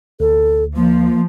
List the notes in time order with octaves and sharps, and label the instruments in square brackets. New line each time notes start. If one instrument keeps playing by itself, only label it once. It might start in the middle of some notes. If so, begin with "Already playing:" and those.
[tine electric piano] D2 [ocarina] A4
[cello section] F3 [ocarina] A#3